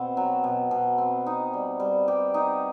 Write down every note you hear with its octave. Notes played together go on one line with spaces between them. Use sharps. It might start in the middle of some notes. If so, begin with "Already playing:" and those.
Already playing: B2 C4
F#3
B2
B2
C4
D#4
G3
G3
G4
D#4